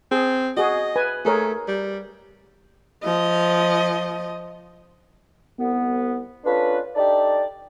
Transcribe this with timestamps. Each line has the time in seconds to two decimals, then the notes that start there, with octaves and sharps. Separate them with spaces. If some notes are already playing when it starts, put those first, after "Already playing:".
0.12 C4 G#4
0.57 F#4 G#4 D#5
0.96 B4 G#5
1.25 A3 G#4 A#4 C#5
1.68 G3
3.04 F3 D#5
5.59 C2 B3
6.45 C#4 D4 F4 A4 B4
6.95 D4 D#4 G4 A4 D5